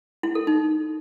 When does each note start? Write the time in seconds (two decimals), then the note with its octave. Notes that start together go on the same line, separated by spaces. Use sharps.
0.23 E4
0.35 A4
0.47 D#4